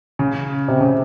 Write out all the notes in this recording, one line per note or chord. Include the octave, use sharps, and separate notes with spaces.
C#3
C3
C#3